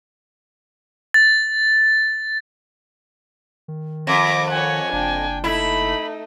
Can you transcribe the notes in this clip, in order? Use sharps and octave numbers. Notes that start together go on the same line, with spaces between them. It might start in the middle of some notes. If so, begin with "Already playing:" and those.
A6
D#3
F2 D6 A#6
C#5 F#5 G#5
F#1 D4 G5
A3 D#4 E4 B5